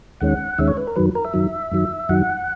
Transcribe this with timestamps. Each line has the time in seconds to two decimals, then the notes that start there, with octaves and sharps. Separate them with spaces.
0.21 D#2 D#3 G#3 C#4 F#5
0.58 D#2 D#3 G#3 C#4 E5
0.68 C#5
0.77 B4
0.87 A#4
0.96 F#2 D#3 F#3 B4
1.15 A#4
1.25 E5
1.34 F#2 D#3 F#3
1.72 F#2 D#3 F#3
2.09 F#2 D#3 F#3 F#5